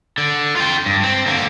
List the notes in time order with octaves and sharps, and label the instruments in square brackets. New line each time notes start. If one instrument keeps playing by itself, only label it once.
[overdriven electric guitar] D3
F4 G5
G2
C4
D3 A#3